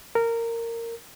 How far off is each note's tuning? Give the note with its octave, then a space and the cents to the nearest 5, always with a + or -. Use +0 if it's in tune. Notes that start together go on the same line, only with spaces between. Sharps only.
A#4 -15